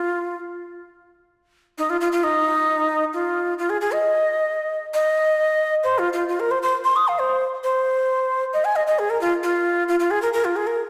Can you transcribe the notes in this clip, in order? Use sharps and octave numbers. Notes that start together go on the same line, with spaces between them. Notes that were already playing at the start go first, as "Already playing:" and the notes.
Already playing: F4
D#4
F4
F4
F4
D#4
F4
F4
G#4
G#4
D#5
D#5
C5
F4
F4
F4
A#4
C5
C5
C6
D#6
F5
C5
C5
D#5
G#5
D#5
D#5
G#4
A#4
F4
F4
F4
F4
G#4
A#4
A#4
F4
G#4
A#4